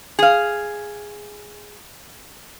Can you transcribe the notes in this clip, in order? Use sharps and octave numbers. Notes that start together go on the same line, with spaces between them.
G#4 F5